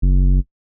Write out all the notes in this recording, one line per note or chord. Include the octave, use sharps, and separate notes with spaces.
F#1